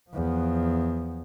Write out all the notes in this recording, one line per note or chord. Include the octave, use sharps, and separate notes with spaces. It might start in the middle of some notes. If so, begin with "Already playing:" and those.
E2 F3